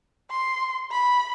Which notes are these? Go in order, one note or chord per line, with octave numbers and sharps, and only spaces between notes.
C6
B5